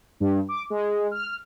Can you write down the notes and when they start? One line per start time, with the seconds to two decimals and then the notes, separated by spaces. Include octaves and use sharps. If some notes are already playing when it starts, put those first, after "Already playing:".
0.20 G2
0.49 D6
0.70 G#3
1.11 F6